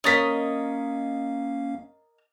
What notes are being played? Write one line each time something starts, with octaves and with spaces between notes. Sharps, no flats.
A#3 C#4 A#4 C#5 D#5 F5 A6 B6